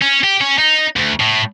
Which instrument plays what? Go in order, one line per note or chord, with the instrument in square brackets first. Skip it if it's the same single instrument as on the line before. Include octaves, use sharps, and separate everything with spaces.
[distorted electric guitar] C#4
G4
C#4
D#4
D2
A2